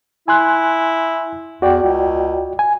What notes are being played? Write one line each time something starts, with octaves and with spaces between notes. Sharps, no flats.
E4 G#5 C6 F#6
E2 F#4 D5 G5
C#2
G#5